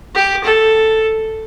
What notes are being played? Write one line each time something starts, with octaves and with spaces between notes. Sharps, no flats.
G4
A4